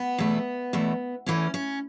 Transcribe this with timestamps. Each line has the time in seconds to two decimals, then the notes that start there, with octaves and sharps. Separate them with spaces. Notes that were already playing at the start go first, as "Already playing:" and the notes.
Already playing: B3
0.18 E2 B2 A3
0.73 E2 B2 A3
1.26 E2 E3 A3 C#4
1.54 C#4